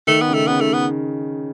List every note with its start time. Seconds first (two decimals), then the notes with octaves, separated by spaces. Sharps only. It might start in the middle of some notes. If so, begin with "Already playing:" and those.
0.07 D#3 A3
0.21 B3
0.28 C#3
0.34 A3
0.47 C#3 B3
0.60 D#3 A3
0.68 C#3
0.73 B3